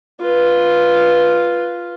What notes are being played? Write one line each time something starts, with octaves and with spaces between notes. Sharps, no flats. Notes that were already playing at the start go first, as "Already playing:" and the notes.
F4 B4